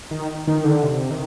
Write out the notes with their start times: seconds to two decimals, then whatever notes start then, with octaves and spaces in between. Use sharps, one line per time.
0.11 D#3
0.47 D#3
0.65 D3
0.83 C3
1.11 D#3